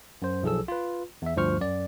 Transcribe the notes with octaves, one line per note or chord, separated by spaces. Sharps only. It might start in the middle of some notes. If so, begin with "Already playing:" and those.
F#2 C5
B1 F3 G#4 A4 E6
F4 B4
E2 E5
D2 G2 F3 C5 C#6 F6
F#2 D5